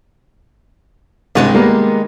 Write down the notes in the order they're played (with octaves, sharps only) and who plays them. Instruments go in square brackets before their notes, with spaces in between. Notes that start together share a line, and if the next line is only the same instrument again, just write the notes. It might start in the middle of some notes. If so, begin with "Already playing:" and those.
[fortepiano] C2 G2 [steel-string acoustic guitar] D#3 G#3 D#4
[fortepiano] G3 A#3 B3